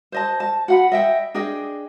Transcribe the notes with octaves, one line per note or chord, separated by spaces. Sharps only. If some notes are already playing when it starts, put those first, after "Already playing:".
C5 D#5 A5
A5
F#4 F#5 B5
D#5 E5 G5
D4 G#4 D#5 G5